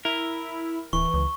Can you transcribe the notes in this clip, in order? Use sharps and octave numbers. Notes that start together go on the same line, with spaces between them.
E4 A#4
D1 E3 C#6
C#2